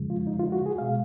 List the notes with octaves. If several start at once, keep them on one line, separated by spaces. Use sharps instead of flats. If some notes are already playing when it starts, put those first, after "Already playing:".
Already playing: F2 C#3 F3 G#3
F4
D#4
F4
F#4
G#4
B2 G#3 F5